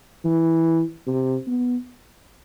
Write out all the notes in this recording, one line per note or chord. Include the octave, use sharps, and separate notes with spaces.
E3
C3
B3